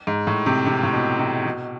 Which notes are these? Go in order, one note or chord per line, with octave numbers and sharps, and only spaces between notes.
G#2
A2
C3
C3
A2
B2
C3
B2